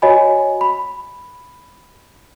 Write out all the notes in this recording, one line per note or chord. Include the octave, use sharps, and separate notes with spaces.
F#4 C#5 D#5 G#5 B5
B5